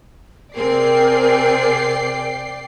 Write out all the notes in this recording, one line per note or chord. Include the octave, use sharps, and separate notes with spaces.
C3 C4 G#4 A#4 D5 G5 C7